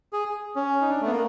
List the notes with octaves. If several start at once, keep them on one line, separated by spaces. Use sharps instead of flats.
G#4
C#4
D#4
D4
A3
B3
A#3